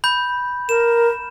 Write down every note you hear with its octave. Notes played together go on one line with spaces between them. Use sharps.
B5 G6
A#4 E7